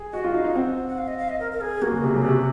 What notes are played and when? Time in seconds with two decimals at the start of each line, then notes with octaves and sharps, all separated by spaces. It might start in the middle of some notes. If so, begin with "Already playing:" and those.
Already playing: G#4
0.13 F#4 D#5
0.24 F4
0.34 D#4 F5
0.44 D#4
0.55 C4 F#5
0.77 F#5
0.87 F#5
0.98 F5
1.08 D#5
1.18 F5
1.29 D#5
1.40 A#4
1.52 A#4
1.61 G#4
1.82 A#3 F#4
1.92 C#3
2.03 C3
2.14 C#3
2.25 C3